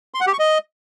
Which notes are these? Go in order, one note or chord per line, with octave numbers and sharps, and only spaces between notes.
C6
F#5
G4
C#6
D#5